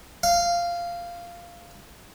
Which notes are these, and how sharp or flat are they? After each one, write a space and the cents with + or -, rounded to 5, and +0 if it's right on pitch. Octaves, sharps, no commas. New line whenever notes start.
F5 -10